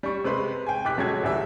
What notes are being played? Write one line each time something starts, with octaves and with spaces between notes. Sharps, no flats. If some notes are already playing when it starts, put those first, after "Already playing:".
G3 C#6
C3 G#3 B4 C6
G5 G#5
F1 G4 D6 F#6 B6
G1 F#3 G#3 A4 G#6
A1 D2 G3 E5